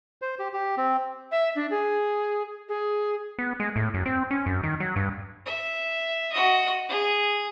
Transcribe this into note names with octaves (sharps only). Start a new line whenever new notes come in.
C5
G4
G4
C4
E5
D4
G#4
G#4
B3
G#3
A2
F#2
C4
C#4
F#2
D#3
F#3
G2
E5
F#4 D#5
G#4